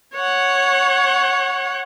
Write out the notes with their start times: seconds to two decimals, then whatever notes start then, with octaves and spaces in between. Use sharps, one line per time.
0.14 C#5 F#5